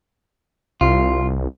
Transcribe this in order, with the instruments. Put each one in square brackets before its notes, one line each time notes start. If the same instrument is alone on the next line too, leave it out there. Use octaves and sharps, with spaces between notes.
[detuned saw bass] C2 [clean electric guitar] F4